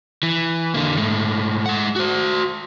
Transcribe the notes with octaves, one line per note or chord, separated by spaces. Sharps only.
E3
D3 A#3
G#2 A3
G#3 F#5
F#4 C5